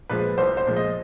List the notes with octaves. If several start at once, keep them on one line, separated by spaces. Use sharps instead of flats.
A#2 F3 G#3 B4
C2 C5
C5
A#2 F3 G#3
D#5